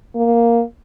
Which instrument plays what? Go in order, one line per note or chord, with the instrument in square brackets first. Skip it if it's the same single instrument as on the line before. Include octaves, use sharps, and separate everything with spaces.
[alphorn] A#3